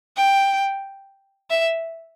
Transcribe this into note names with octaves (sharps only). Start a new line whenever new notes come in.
G5
E5